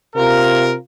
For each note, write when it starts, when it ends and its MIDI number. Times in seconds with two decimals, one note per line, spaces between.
0.16 0.75 48
0.16 0.75 65
0.16 0.75 70